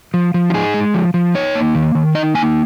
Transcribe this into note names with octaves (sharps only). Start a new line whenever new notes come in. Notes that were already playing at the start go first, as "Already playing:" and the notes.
F3
F3
F4
D#4 G#4
G#3
F3
F3
D#4 C#5
A#3
D#3
D#3
D#4 D#5
A#3 G#5